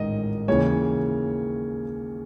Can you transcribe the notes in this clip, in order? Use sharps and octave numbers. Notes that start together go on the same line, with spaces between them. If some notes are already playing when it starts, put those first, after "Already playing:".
Already playing: A1 G#2 D#3 D#5
D#2 C#3 E3 C#5